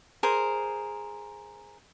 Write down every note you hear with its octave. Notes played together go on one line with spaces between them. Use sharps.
G#4 A#4 C5